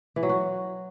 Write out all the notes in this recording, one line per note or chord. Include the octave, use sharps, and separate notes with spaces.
E3
F#3
F#4